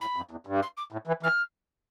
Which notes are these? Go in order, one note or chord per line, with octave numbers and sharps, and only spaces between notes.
A2 B5
F2
E2
G2
C6
D6
A2
E3
E3 F6